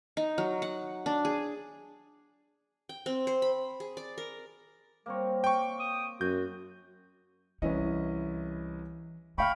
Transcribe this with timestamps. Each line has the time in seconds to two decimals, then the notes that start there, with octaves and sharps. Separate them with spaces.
0.17 D#4
0.38 F#3
0.62 F#5
1.06 D4
1.25 G#4
2.89 G5
3.06 C4
3.27 C5
3.42 B5
3.80 G#4
3.97 D5
4.18 A#4
5.06 G3 A#3 C4 C#5
5.44 G5 C#6
5.80 D#6
6.21 F#2 F#4 G6
7.62 C2 E3 C#4 E4 B4 D#5 E5
9.38 C#3 A3 E5 F5 G5 B5 C#6 F6